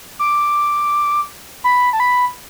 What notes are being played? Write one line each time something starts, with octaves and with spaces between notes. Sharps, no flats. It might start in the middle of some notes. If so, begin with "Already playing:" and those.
D6
B5
A5
B5